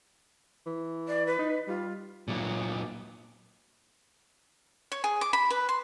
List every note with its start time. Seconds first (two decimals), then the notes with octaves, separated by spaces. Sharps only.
0.66 E3
1.08 D5
1.27 B4
1.39 D#4
1.68 G3 F4
2.28 A#2 F#3
4.92 C#5
5.04 G#4
5.21 D6
5.33 B5
5.50 B4
5.69 C6